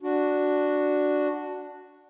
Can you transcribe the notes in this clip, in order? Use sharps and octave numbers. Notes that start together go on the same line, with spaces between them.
D4 F#4